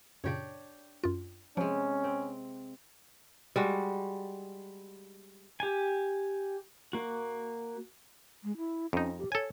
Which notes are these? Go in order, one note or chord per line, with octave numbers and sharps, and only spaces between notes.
F#2 A#2 C#3 D4 G4 C#5
F#2 F4
C3 F3 G#3 C#4
C4
G3 G#3 F#4
G4 G#5
A#3 F#4
G#3
E4
F2 C#4 D#4
G4
A4 C#5 G#5